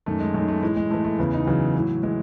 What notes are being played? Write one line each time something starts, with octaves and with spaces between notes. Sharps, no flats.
F#2 D#3 A3
G#3
F#2 D#3 A3
A3
A2 E3 G#3
G#3
A2 E3 A3
A3
E2 C#3 E3 B3
D#4
E2 C#3 E3 F#3
A2 E3
A2 E3 G#3